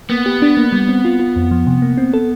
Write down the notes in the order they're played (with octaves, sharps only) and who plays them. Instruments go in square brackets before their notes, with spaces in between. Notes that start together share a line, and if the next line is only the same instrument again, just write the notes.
[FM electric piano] A#3 [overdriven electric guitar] B3
[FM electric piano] G4
D4
A#3
G3
C4
F4
F4
F2
F3
C3
A#3
C4
A4